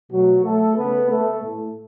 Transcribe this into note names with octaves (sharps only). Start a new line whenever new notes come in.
B2 F#3 A3 F#4
A3 A4
C#3 A3 B3 B4
A3 A4
A2 A3